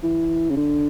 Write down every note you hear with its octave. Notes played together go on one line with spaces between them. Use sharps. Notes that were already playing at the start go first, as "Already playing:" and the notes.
E3
C#3
D3